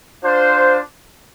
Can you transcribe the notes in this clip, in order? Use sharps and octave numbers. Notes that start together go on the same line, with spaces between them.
D4 F4 C5